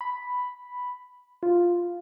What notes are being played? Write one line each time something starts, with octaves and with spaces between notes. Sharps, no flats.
B5
F4